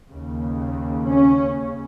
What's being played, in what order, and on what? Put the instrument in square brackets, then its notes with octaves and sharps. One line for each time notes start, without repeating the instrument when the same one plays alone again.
[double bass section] D#2 C#3
C#4